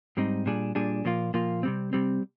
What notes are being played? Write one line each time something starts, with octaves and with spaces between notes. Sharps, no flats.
G#2 G3 C4 D#4
A#2 G3 D4 G#4
A#2 G3 D4 G#4
A#2 F3 A#3 F4
A#2 F3 A#3 F4
C3 G3 C4
C3 G3 C4